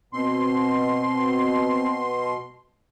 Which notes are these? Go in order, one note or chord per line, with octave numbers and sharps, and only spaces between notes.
B2 C4 C6